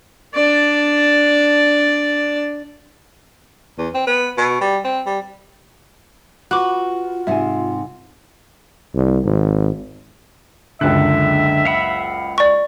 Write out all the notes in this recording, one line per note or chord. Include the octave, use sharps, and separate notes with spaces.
D4 D5
E2
C4
B3
B2
G3
C4
G3
F4 F#4 B4 D6 F#6
G#2 C3 C5 E5 G#5
C2
G#1
F#1 C#2 D3 E5 F#6
F5 F#5 B5
D5 C#6